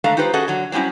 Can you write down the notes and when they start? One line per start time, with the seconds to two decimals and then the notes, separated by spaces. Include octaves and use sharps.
0.04 D3 G#3 A3 F5 A#5
0.17 D#4 F4 G4 B4 C5
0.33 C#4 F#4 G#4 A4 D#5 F#5
0.48 D3 F#3
0.72 F#3 G3 C4 C#4 E4